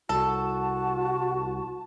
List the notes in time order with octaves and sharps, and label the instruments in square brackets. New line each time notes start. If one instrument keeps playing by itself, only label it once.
[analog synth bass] C2 [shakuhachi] F#4 [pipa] A4 [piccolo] A5